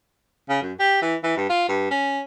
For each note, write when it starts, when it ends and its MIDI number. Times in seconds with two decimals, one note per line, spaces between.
0.49 0.59 49
0.62 0.73 42
0.80 1.00 67
1.02 1.15 52
1.23 1.34 52
1.37 1.46 43
1.50 1.66 65
1.69 1.90 43
1.91 2.21 61